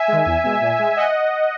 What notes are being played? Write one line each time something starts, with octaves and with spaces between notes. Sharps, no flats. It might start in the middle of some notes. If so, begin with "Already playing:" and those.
Already playing: E5 G#5
D#3 G#3
E2
B2 G#3
A#2
G#3
D#5 F#5